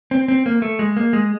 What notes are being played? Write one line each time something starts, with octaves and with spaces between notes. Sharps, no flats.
C4
C4
A#3
A3
G#3
A#3
G#3